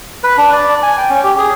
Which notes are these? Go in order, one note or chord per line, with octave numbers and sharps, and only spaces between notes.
B4
D4
D5
G#5
G5
C#4
G4
G#4